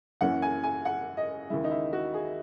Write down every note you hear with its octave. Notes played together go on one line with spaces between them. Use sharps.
F#2 E3 A#3 C#4 F#5
G#5
G#5
F#5
D#5
D#2 C#3 E3 G#3 E4
D#4
E4
F#4
G#4